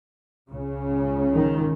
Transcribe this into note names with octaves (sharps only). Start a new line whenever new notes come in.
C#2 C#3
D#3